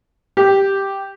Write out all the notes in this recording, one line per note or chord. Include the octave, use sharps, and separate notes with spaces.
G4